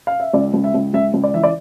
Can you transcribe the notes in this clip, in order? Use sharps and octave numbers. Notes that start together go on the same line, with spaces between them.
F5
E5
C#2 D5
C#2
E5
C#2
C#2 E5
C#2
D5
E3 E5
D5